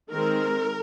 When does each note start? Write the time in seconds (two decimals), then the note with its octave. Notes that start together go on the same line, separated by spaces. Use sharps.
0.10 D#3 G#3 C4 A#4